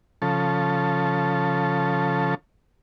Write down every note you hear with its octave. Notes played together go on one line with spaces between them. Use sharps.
C#3 F3 A4